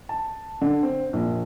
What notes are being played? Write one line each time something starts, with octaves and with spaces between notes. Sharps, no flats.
A5
D3
C4
A#1